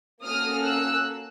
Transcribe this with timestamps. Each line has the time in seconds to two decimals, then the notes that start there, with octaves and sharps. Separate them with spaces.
0.23 A#3 C#4 F#4 A4 D#6 F6
0.64 E6 F#6